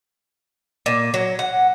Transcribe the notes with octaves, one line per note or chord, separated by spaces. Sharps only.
A#2
F#3
F#5